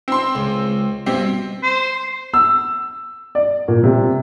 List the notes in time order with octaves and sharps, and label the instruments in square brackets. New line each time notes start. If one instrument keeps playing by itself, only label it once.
[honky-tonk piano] C4 C6
[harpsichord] C#2
[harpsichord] G2 B2 [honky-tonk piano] C4
[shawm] C5
[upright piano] E6
D5
A#2
C3